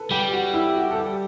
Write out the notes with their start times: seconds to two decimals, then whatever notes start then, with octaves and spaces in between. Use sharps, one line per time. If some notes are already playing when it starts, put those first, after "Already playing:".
Already playing: A4 B4
0.11 G3 G4
0.32 F#4
0.54 E4
0.75 F#4
0.90 A4
0.96 G4